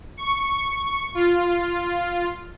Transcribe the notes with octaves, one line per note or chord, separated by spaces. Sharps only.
C#6
F4